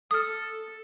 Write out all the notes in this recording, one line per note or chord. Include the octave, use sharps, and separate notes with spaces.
A4 D#6 F6